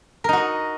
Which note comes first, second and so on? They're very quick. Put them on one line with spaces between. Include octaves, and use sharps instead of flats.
A#4 D#4 F#4 D#5